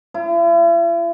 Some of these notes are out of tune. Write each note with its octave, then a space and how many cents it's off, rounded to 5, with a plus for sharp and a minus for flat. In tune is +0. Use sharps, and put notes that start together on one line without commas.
E4 +45